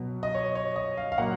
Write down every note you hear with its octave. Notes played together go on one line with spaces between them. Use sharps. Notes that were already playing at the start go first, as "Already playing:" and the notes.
Already playing: B2 F#3 B3
D#5
C#5
C#5
D#5
F5
F5
A#2 F#3 A#3 F#5